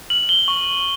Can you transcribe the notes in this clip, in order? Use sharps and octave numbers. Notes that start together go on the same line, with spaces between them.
F6 F#7
G7
C#6